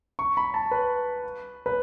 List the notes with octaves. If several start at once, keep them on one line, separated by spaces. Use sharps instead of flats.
C#6
B5
A5
B4
B4